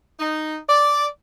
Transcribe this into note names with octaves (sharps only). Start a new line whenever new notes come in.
D#4
D5